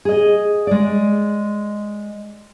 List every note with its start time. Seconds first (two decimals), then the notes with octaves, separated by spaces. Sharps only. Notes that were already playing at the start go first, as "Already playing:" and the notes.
0.05 G#4 D#5
0.67 G#3 D5